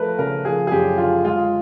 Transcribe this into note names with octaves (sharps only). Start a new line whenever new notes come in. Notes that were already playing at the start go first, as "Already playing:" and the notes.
Already playing: F3 A3 A#4 B4
C#3 A#4
F3 G#4
G#4
F#2 G4
D3 F4
G#3 F4